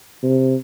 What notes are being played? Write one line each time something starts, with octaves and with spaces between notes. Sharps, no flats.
C3